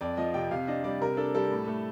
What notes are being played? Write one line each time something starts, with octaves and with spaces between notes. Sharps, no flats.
F2 D5
F3 D#5
C3 G5
C3 F5
D4 D#5
G3 D5
C3 A#4
D4 A4
G3 A4
A2
A3